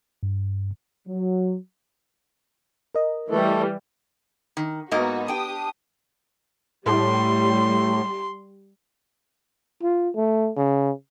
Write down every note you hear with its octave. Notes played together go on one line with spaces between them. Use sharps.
G2
F#3
A#4 D#5
E3 G3 A3 A4
D#3
G#2 A#3 B3 D#4 F#4 D#5
D4 G4 G5 D#6
A2 G3 C6
F4
A3
C#3